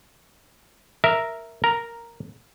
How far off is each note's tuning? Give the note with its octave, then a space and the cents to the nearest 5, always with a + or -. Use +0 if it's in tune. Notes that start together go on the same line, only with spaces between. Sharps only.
A#4 +0 E5 +0
A#4 +0 A#5 +0